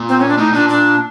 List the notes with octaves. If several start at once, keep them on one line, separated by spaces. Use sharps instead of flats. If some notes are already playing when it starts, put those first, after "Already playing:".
Already playing: A#2
C4
C#4
D4
A2 D#4
A#2 D4
D4